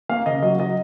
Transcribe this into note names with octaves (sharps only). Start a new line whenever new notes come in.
A#3 F5
C#3 D#5
F#3 D#5
F#3 D#5